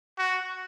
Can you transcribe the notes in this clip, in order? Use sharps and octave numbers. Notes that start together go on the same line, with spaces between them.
F#4